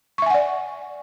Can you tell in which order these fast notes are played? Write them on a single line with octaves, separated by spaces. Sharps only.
C#6 E5 G#5 F#5 D5